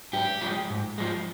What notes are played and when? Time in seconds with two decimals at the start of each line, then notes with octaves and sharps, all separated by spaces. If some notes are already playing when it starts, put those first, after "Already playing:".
0.13 G#2 G4
0.41 F3 G#3
0.70 G#2
0.98 F3 G#3